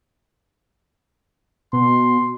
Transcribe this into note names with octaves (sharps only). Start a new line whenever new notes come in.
B2 C6